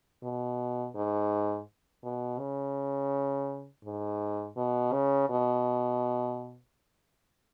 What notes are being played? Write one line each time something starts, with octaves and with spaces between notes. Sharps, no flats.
B2
G#2
B2
C#3
G#2
B2
C#3
B2